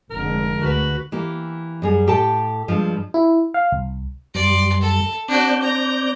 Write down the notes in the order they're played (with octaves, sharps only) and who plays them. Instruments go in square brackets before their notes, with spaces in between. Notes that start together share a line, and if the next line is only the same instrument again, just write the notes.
[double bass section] F1 D3 G#3 [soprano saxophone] A#4
[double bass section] D2 [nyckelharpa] F#4 B4
[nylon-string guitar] E3 A#3 G4
F#2 G3 G#4
A2 G4 A4 G5 A5
G2 F3 G#3
[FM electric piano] E4
F5
C2
[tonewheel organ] F#2 G3 [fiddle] D5 C6
[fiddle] A4
[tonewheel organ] C4 D5 G6 [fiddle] D4 F#4
[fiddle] A#5